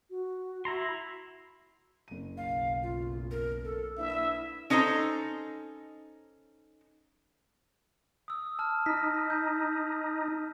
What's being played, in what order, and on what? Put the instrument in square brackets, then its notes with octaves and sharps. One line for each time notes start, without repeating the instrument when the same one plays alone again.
[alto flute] F#4
[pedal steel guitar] E4 A#5 C6 [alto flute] F#4
[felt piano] F#1 D#7
[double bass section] B1 [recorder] F5
[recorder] F4
A#4
A4
[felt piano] A#3 D4 B4 [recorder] E4 [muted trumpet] E5
[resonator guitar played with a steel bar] C#4 D#4 A4 C5 A#5
[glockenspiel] D#6 E6
A5 F6
[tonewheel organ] D#4 [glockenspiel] B6
[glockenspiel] G6